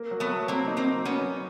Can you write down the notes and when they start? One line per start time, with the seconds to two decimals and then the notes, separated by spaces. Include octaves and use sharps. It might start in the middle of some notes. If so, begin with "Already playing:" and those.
Already playing: A#3
0.11 F#3
0.20 A3 B3
0.30 F#3
0.48 F#3 A#3 C4
0.67 D#4
0.77 A#3 C4
0.87 D#4
1.05 F#3 B3 C#4
1.25 F#3